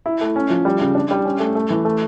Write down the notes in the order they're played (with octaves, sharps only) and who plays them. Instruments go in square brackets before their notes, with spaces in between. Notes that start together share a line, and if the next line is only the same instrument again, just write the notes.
[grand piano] E4
A3
C#4
F3
G3
C#3
D4
G3
C#4
A3
A3
E3
A3